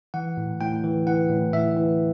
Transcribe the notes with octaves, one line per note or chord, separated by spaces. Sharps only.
E3 F#5
A2
A2 G5
E3
E3 F#5
A2
A2 E5
E3